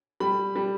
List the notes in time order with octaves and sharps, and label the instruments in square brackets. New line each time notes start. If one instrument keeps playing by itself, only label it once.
[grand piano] G3 B5
G3